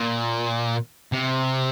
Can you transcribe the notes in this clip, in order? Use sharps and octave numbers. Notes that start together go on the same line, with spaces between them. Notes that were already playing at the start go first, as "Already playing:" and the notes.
Already playing: A#2
C3